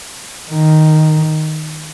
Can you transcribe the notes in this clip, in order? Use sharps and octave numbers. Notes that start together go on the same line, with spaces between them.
D#3